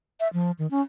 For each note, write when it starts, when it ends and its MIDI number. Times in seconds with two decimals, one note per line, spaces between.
0.20 0.28 76
0.33 0.51 53
0.59 0.69 51
0.71 0.81 61